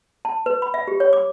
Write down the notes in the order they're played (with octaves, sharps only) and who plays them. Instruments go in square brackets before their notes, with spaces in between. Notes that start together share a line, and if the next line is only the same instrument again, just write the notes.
[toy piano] A5
B4
B5
E5
G4
C#5
D6